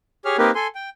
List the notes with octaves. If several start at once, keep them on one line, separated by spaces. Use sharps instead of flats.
G4 G#4 C#5 F6
A#3 C4 D#4 G4 A#4 B4
A4 G#5 C6
G5